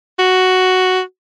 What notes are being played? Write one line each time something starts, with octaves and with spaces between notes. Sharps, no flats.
F#4